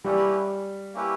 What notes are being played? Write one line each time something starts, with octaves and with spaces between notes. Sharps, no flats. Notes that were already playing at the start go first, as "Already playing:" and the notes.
G3 A#3 C#4 E4 G4 B4
A#3 C#4 E4 G4 B4